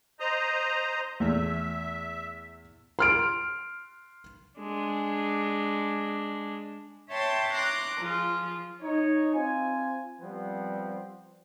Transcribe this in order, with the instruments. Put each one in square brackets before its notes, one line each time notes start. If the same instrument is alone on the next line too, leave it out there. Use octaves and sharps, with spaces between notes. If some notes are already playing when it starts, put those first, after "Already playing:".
[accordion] C5 D#5 A#5
[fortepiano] E2 A3 [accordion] E5
[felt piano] C6 F6 D7
[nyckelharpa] G#3 D4
[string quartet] C#5 E5 G5 A5 C6
A#5 C6 D6 F#6
F3 F4 G#4
[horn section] D#4 C#5
C4 F4 G#5
F3 G3 B3 C4